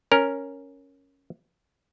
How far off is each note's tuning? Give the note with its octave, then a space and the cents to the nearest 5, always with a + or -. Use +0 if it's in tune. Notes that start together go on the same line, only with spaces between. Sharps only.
C#4 +0 A#4 +0